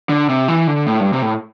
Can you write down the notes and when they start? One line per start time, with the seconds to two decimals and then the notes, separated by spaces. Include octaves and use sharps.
0.09 D3
0.29 C3
0.48 E3
0.67 D3
0.87 A2
1.00 G2
1.13 C3
1.22 A2